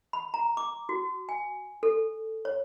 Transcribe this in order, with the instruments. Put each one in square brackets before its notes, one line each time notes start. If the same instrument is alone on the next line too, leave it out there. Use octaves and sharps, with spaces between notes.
[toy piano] B5
A#5
D6
F#4
G#5
A4
C#5